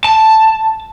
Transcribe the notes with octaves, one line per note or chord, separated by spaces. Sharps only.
A5